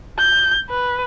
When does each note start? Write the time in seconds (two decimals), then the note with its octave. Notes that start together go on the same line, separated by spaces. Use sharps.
0.18 G6
0.70 B4